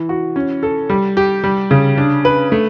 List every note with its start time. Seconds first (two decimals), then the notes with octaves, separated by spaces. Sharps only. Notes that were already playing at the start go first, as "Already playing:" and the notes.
Already playing: E3
0.09 F#4
0.36 C#4
0.63 A4
0.90 G3
1.17 G4
1.44 G3
1.71 C#3
1.98 D4
2.25 B4
2.52 A3